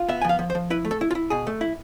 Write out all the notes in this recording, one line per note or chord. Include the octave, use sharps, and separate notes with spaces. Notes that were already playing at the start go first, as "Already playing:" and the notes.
Already playing: F4
B3 E5
G#5
F3 F5
F3
C5
F3
E4 B4
A3
A4
E4
F4
E4
B2 G#4
A3
E4